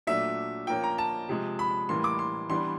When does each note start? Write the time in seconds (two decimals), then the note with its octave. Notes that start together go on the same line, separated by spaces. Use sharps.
0.07 A#2 F#3 A3 D4 E5
0.67 F3 A#3 C#4 G5
0.83 A#5
0.98 A5
1.29 C3 F3 G#3
1.59 B5
1.89 A2 E3 G3 A#3 C6
2.04 D6
2.19 C6
2.49 E3 G3 B3 D4 C6